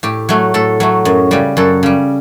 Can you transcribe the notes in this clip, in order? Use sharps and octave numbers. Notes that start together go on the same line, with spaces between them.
A2 G4
F#3 A3
A2 A4
F#3 A3
F#2
C#3 G3
F#2 A4
C#3 G3